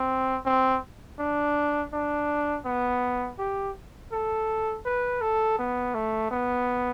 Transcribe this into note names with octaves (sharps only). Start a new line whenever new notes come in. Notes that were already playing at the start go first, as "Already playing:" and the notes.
Already playing: C4
C4
D4
D4
B3
G4
A4
B4
A4
B3
A3
B3